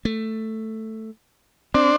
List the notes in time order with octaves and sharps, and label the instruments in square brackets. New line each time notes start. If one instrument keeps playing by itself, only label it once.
[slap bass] A3
[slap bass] C4 [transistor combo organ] D4 C5 D5